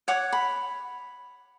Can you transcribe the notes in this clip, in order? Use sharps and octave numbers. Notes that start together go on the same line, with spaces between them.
C#5 F#5 D6
B5